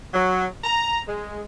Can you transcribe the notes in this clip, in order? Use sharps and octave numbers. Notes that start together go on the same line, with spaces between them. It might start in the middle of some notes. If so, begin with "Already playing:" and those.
F#3
A#5
G#3